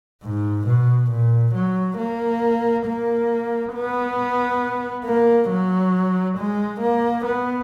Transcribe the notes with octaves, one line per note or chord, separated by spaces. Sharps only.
G#2
B2
A#2
F#3
A#3
A#3
B3
A#3
F#3
G#3
A#3
B3